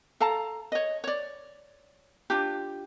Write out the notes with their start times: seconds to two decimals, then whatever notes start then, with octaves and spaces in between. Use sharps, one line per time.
0.20 A4 F5 A5 A#5
0.72 C#5 D#5
1.04 C#5 D5
2.30 D4 F4 G4